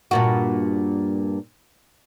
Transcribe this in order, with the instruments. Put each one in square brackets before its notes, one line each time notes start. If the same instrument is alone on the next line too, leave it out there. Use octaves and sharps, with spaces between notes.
[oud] G2 A#2 F#4